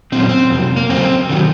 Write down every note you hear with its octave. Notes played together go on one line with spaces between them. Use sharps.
A#2 F#3 C4
C#4
C4
F2 C3 F#3
A#3
F#2 C#3 F#3 C4
C3 D#3 F#3